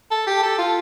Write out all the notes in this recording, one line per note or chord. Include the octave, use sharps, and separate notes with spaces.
A4
G4
A4
F4